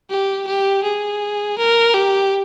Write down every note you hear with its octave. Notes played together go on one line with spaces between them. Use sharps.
G4
G4
G#4
A#4
G4